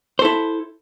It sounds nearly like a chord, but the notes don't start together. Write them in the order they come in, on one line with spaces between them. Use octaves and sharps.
C5 A4 E4